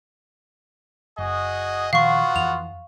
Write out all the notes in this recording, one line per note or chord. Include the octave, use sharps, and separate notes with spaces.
F#1 F#4 G#4 D#5
A#2 D#3 F3 B3 F4 F#4 F5 C#6
F2 E3 F7